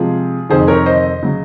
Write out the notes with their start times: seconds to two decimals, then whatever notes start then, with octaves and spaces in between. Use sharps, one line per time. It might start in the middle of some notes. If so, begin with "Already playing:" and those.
Already playing: C3 F3 G#3 F4 G#4
0.49 F2 C3 D#3 G#4 C5
0.67 A#4 C#5
0.86 C5 D#5
1.23 C#3 F#3